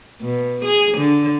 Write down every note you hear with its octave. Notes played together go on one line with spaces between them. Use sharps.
B2
G#4
D3